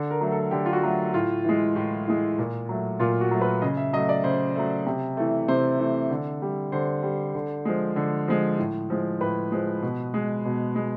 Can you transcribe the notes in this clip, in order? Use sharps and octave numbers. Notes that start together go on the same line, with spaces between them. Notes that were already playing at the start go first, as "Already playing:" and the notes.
Already playing: D3
A#4
F#3 A3
A4
D3 G4
F4
F#4
F#3 A3
A2 F4
E3 G#3
A2
E3 G#3
A#2
F#3 A3
A#2 F4
F#4
F#3 A3
B4
C#3 D#5
E5
F#3 A3 D#5
D5
C#3 C5
F#3 A3
C3
E3 A3
C3 C5
E3 A3
D3
G3
D3 C5
G3
D3
F3 G#3
D3
F3 G#3
A2
F3 G#3
A2 B4
F3 G#3
B2
G#3
B2
G#3